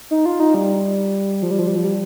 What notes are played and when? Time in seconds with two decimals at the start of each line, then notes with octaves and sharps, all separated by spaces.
0.11 D#4
0.25 F4
0.40 D#4
0.54 G3
1.42 F3
1.51 G3
1.59 F3
1.67 G3
1.76 F3
1.84 G3